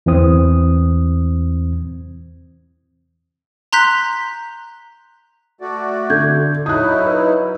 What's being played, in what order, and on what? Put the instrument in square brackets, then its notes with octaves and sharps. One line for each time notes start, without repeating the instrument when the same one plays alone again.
[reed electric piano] E2 E3 C4 D#6
[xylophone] A#5 C6 F#6 G6 B6
[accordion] A3 F#4 D5
[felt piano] D3 [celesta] G6 G#6
[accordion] F#3 D#4 E4 [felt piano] D#6 F#6
[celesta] B4 D#5